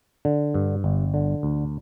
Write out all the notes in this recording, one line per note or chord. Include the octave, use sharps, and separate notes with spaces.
D3
G2
G1
D3
D2